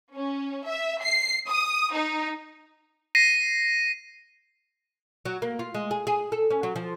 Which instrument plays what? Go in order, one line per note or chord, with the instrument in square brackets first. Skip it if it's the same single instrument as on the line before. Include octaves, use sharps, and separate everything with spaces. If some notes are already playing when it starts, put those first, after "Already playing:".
[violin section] C#4
E5
C7
D#6
D#4
[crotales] A#6 C7 D#7
[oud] F#3
A#3
F4
G#3
G#4
G#4
A4
C#4
F#3
F3